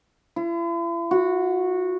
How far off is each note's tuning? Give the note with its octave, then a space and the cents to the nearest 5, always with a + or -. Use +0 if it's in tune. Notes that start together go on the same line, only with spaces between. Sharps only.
E4 +45
F#4 -15